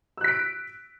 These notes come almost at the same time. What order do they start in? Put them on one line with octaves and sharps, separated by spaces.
E6 F#6 B6 D7